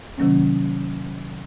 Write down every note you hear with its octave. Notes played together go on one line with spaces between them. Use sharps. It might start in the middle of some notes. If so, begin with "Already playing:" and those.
C3 D#3 F#3 A#3 C#4